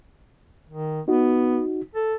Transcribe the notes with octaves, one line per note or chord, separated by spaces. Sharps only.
D#3
B3 D#4 F#4
A4